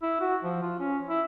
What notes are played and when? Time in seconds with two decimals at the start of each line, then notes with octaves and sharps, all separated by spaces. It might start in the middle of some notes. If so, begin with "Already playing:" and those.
0.02 E4
0.21 F#4
0.43 F3
0.62 F4
0.79 C#4
1.09 E4